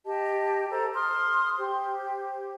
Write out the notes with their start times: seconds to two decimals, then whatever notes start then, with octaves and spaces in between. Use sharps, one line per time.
0.06 G4 D#5 A5
0.70 A4 C5 A#5
0.94 C6 D#6 F6
1.58 G4 C5